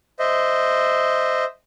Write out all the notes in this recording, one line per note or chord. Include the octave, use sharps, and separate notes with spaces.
C5 D#5 E5